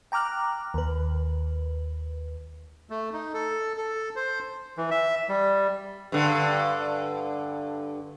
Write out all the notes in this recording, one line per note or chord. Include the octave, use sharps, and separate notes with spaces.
G5 A#5 D6 F6 F#6
D#2 B4
A3
D#4
A4
A4
C5
E3
E5
G3
G2 D3